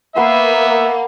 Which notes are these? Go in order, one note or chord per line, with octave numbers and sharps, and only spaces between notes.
A#3 B3 B4 E5 F#5 C6